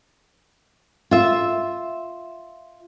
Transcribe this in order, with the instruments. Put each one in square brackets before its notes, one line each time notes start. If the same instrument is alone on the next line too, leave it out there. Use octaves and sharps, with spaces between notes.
[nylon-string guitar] F4 E5